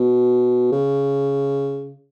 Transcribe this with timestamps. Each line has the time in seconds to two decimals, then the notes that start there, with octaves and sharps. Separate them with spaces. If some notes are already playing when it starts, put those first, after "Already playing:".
Already playing: B2
0.72 C#3